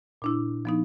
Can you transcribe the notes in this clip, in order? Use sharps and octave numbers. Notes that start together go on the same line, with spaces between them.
A#2 D4 E4
F3 B3 D#4